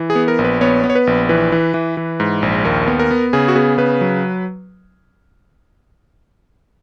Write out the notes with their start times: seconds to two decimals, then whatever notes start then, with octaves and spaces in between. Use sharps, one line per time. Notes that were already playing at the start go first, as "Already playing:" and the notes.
Already playing: E3
0.10 G#4
0.15 B3
0.28 A#4
0.39 A#1
0.44 B4
0.61 B3 C#5
0.84 B3
0.90 C#5
0.95 B4
1.07 A#1
1.29 E3 B4
1.52 E3
1.74 E3
1.97 E3
2.20 G#2
2.42 A#1
2.64 D#2 A#4
2.88 B3
2.99 A#4
3.11 B3
3.33 C#3 G#4
3.48 F#4
3.56 B3 G#4
3.78 C#3 B4
4.01 F#3